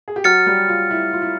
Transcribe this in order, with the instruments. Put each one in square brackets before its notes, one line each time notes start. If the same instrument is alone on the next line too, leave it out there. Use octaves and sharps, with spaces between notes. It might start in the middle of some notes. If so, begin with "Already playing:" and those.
[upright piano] G#4
G4
[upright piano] F#3 F#4 [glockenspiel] F6 A6 C#7
[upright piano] G3 G4
F4
E4
F4
E4